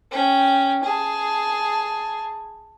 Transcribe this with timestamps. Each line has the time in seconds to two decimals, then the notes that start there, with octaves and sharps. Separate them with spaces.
0.11 C#4 G5
0.84 G#4 A5